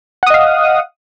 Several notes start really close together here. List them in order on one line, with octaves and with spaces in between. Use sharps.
F#5 D#6 D#5 F5